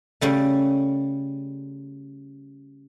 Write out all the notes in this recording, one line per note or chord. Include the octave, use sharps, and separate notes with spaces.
C#3 G3 A3